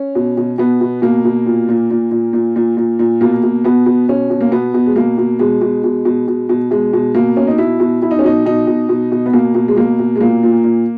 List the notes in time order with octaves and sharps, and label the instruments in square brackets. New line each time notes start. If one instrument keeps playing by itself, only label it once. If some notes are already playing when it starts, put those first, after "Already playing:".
Already playing: [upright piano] C#4
B2
B2
B2 B3
B2
B2 A#3
B2
A#2
A#2
A#2
A#2
A#2
A#2
A#2
A#2
B2 A#3
B2
B2 B3
B2
B2 C#4
B2
A#3
B2 B3
B2
G#3
B2 A#3
B2
B2 G#3
B2
B2
B2
B2
B2
B2 G#3
B2
B2 A#3
B2 C#4
D#4
B2 E4
B2
B2 E4
D#4
C#4
B2 D#4
B2 D#4
B2
B2
B2
B3
B2 A#3
B2
G#3
B2 A#3
B2
G#3
A#2 A#3
A#2
A#2